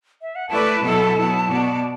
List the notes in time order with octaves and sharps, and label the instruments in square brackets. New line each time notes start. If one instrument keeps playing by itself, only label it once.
[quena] E5
F#5
[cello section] A3 E4 B4 D5 [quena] A5
[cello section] B2 F#3 B3 E4 A4
F#3 B3 E4
B2 B3 F#4 D5